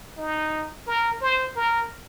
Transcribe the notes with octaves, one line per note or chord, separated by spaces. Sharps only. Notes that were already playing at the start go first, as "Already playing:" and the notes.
D#4
A#4
C5
A#4